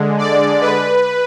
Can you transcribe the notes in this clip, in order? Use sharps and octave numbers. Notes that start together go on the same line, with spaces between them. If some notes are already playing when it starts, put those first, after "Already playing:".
Already playing: D3 G#3
D5
B4